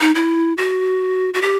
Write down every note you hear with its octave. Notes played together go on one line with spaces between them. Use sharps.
D#4
E4
F#4
F#4
G4